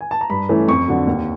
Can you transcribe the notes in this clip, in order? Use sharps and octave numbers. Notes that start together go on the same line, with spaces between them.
G#5
A5
A#5
G2 B5
E3 A3 C#4 E4
F2 C#6
D3 F#3
D#2